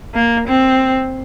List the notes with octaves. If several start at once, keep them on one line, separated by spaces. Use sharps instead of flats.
A#3
C4